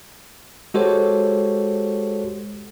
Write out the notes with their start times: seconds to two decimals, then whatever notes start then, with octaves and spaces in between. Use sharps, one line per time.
0.74 G#3 F#4 G4 A4 C5 C#5